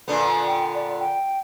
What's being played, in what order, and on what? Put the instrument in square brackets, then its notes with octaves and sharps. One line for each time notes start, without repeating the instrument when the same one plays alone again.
[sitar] A#2 D3 B3
[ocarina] G5
D5
G5